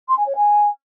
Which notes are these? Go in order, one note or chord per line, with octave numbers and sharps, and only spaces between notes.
C6
G#5
C#5
G#5